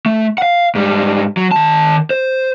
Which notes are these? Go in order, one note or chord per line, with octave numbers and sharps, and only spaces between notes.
A3
F5 F#5
G#2 G3
F#3
D#3 A5
C5